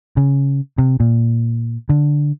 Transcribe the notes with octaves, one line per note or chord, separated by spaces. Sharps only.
C#3
C3
A#2
D3